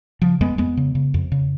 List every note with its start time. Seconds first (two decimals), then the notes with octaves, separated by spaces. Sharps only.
0.22 C#3 F3
0.41 F2 G#3 B3
0.58 F2 G#3 B3
0.77 C#3
0.95 C#3
1.14 F2
1.32 C#3